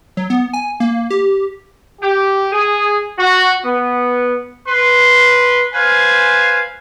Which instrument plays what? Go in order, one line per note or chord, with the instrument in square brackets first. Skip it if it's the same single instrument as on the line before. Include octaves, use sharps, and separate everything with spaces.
[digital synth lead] F#3
B3
G#5
A#3
G4
[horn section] G4
G#4
F#4
B3
[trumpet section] B4 C6
B4 C5 F5 G#5